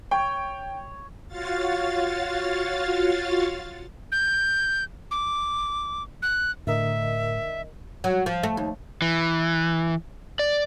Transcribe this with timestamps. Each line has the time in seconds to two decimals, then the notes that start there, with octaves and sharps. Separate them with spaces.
0.11 C#5 G5
1.28 F4 F#4 C#5 F5 A6
4.12 G6
5.11 D6
6.22 F#6
6.67 A2 D3 A#4 D#5 E5
8.04 F#3
8.26 F3
8.43 A3
8.57 D#2
9.02 E3
10.39 D5